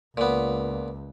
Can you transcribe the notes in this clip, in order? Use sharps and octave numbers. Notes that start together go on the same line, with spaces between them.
C#2 A#2 B3